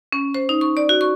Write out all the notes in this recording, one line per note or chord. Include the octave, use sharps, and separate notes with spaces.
C#4
C5
D#4
C#6
D5
F#4
C#6